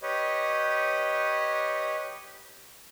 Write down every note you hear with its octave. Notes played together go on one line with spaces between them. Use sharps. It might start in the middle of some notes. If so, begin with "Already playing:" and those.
G4 B4 C#5 D#5